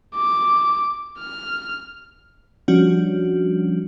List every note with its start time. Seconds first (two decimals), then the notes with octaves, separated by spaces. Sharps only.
0.15 D6
1.19 F6
2.68 F3 G3 C#4 D4 F#4